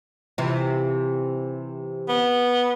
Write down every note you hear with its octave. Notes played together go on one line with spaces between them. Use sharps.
C3 E3 F4
B3